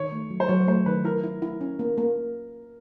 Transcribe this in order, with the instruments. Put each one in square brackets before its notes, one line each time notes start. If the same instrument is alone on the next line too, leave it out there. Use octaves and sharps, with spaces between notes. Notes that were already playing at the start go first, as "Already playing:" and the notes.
Already playing: [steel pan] D#3 [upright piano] C#5
[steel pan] A3
F#3
[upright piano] C5
[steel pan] F#3 [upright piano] C#5
[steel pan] A3 [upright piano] C5
[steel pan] D#3 [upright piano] B4
[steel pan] E4 [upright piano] A#4
[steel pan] E4
E4
C#4
A#3
A#3